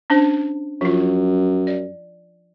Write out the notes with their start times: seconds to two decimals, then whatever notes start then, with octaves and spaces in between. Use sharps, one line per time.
0.10 C#4 D4 C5
0.81 F#2 F3 F4
1.67 D5